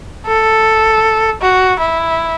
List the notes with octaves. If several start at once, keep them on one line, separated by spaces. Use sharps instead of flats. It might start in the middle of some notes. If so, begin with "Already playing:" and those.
A4
F#4
E4